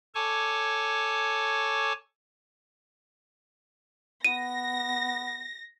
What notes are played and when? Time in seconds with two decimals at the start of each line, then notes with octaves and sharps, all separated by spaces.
0.15 A4 C#5 G#5 A5 C#6 D6
4.25 B3 A#6 D#7